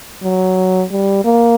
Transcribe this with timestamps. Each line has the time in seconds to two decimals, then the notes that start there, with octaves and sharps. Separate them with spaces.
0.24 F#3
0.91 G3
1.24 A#3